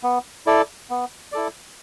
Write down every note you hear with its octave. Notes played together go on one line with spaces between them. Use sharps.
B3
E4 A4 D5
B3
E4 A4 D5